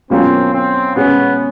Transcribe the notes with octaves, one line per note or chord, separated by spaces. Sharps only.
B2 F#3 A#3 C4 C#4 F4
C4
B2 G#3 B3 C#4